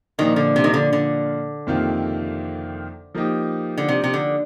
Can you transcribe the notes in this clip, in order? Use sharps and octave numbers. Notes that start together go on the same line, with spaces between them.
A#2 D#3 F3 A#3 D4 F4
D3
C3
D#3
D3
D3
F2 C3 D#3 A#3 F4
F3 A#3 D#4 G4
D3
C3
C3
D3